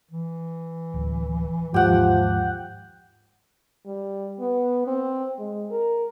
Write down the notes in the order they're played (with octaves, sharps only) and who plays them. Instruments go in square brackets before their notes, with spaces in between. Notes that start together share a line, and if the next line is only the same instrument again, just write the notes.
[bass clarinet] E3
[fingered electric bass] D1
[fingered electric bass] D#2 G#2 [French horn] F3 [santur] G4 F#5
[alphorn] G3
B3
C4
G#3
A#4